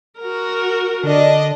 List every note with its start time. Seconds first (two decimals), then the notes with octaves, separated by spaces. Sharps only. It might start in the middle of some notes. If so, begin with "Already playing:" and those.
0.20 F#4 A#4
1.04 D3 D4 D#5